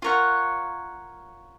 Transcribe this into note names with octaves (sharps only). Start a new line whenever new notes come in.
F4 A#4 C#5 F#5